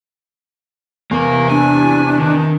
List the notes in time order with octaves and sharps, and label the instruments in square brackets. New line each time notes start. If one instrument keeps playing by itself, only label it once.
[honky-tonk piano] E2 [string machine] C3 E4 [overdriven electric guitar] A#3 A#4
[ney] D4 [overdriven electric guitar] G#5
[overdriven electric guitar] D#3